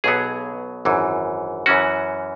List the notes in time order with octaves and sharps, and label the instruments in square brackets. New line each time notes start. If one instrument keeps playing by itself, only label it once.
[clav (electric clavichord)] B1 B2 F#3 B3 G#4
G#1 F#2 E3
F#2 E3 C#4 F#4